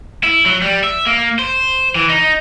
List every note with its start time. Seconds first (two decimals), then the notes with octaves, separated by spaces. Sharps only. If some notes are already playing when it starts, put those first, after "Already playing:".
0.24 E4
0.46 F#3
0.62 G3
0.84 E5
1.07 A#3
1.39 C5
1.95 E3
2.09 D#4